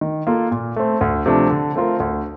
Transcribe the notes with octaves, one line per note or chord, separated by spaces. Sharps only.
D#3
A#3 F4 A4
A#2
A3 C4
D2
C3 F3 A3 D4
D3
A3 C4 F4 A#4
D2